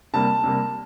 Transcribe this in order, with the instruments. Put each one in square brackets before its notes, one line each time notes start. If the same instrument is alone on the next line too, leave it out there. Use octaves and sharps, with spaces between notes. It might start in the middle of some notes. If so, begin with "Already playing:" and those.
[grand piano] C3 G3 A#3 A5
C3 G3 A#3